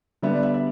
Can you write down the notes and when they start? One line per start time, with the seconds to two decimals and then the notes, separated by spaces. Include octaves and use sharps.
0.22 D3 G3 B3 E5
0.33 D5
0.43 E5
0.54 E5